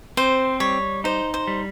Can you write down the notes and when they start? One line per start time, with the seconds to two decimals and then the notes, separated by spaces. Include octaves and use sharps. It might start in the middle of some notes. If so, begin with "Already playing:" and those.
0.17 C4 C5
0.60 G3 C#5
1.04 D#4 C5
1.34 C5
1.47 G3